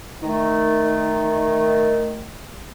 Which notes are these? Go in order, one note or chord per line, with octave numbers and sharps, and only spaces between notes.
D#3 A3